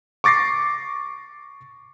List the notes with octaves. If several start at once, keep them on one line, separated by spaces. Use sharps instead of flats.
C#6 D6 A6 A#6 C7